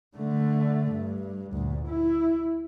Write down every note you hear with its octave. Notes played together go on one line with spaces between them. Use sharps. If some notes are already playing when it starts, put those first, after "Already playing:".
D3 A3
G2
D2 A#2
E4